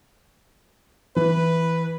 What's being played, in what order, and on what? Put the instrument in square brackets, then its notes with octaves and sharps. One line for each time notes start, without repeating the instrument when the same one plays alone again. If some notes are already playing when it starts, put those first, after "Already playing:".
[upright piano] E3 [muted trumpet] B4